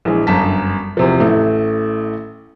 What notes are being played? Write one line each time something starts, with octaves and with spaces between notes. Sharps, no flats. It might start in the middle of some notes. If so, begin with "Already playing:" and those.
A#1 E3 G#3
G1 F#2 A5 B6
E2 C3 F3
A1 A3 E4